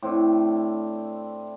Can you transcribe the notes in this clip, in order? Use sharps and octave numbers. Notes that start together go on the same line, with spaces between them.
A2 C4 D4